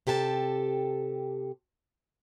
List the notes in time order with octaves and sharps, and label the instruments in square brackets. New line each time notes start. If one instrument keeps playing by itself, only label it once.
[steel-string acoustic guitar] C3 G4 A4 G#5 A5